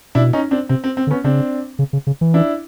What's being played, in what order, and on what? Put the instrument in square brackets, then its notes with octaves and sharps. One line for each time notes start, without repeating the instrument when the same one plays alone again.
[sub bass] B2 [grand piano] D4 E4
[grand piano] C#4 D#4
C4 D4
[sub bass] C3 [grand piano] C4
[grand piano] C4
C4
[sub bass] D3
[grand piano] B3 C#4
[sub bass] C#3 [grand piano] C4 D4
[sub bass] C#3
C#3
C#3
E3
[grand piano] D4 E4